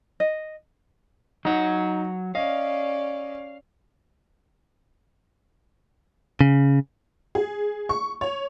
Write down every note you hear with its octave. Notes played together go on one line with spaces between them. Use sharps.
D#5
F#3 D#4 F#5
C#4 D5 D#5 F5
C#3
G#4
C#6
C#5